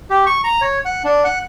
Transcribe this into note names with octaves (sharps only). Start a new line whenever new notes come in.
G4
C#6
A#5
C#5
F#5
D4
F#5